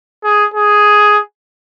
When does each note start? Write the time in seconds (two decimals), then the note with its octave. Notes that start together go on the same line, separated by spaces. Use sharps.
0.24 G#4
0.54 G#4